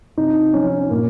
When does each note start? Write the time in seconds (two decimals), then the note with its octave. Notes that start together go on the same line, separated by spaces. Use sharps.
0.17 C3 D#4
0.53 F3 C#4
0.66 D#4
0.77 C#4
0.90 A#2 A#3